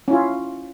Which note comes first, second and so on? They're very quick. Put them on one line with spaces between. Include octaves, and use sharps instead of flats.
C#4 E4 F4